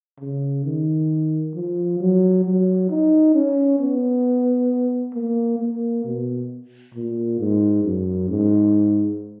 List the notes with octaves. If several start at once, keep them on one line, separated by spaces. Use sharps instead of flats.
C#3
D#3
F3
F#3
F#3
D#4
C#4
B3
A#3
A#3
B2
A#2
G#2
F#2
G#2